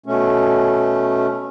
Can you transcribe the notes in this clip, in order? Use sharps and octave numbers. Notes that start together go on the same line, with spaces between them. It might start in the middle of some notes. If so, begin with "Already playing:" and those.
B2 A3 C#4